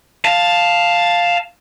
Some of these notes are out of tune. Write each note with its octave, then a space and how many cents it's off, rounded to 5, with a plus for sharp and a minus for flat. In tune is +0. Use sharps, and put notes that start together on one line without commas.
F5 +0 A5 +0